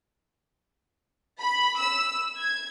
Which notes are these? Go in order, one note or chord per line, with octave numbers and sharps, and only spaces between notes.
B5
E6
G#6